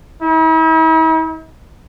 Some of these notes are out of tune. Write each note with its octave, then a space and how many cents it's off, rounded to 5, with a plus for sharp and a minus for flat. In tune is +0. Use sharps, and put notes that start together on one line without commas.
E4 -45